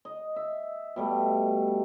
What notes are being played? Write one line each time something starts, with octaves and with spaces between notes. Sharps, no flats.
D#5
E5
B2 G3 A3